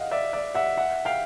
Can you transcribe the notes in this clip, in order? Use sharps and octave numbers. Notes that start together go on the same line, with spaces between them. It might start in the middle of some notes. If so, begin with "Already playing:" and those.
Already playing: D#5 F5 F#5
D5 E5
D5 E5
E5 F#5
E5 F#5
F5 G5